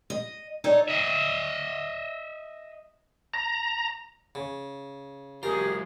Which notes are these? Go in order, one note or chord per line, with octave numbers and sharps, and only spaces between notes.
D#5
D#4 A4 C#5 D5
D#5 E5
A#5
C#3
F#3 G#3 F4 G4 G#4 A#4